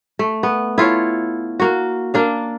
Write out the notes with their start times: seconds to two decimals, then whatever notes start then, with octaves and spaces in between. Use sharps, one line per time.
0.19 A3
0.43 B3
0.78 E4 F4 A4 C#5
1.60 A#3 F#4
2.14 A#3 D4 F5